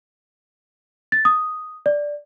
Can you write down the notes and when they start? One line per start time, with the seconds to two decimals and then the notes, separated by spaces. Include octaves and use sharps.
1.12 A6
1.25 D#6
1.86 D5